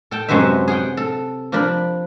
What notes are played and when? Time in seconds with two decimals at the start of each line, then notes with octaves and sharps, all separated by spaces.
0.11 A4 G5 A5
0.28 F#2 C3 G#3 F#4 B4 E5
0.68 G#4 F#5 G5
0.97 A4
1.52 F3 D4 A#4 D5 B5